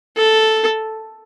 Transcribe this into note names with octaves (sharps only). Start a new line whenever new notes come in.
A4